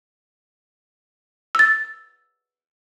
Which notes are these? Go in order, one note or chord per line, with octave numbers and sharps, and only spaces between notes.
E6 A6